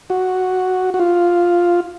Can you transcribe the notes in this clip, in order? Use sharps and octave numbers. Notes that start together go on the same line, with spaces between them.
F#4
F#4
F4